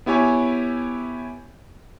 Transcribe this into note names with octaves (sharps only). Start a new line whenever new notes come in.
B3 E4 G4 C#5 G#5